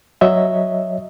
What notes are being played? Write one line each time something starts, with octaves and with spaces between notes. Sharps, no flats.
F#3 C#5 D#5 E5